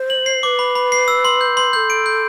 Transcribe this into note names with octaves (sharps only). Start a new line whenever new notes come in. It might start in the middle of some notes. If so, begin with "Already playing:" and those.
Already playing: C5
F#7
C7
B4 C5 D6
B5
B5
C7
E6
C6
G6
C6
A4 B4 G6
D7
G6